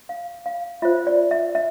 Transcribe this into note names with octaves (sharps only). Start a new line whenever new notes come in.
F5
F5
F4 C5 E5
D5
E5
E5